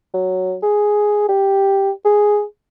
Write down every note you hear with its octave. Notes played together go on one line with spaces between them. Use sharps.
F#3
G#4
G4
G#4